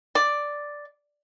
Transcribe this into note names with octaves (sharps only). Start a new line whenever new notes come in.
D5